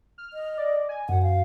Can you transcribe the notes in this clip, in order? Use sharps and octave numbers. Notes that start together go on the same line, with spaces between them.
F6
D#5
D5
G#5
F#2 F#5
F5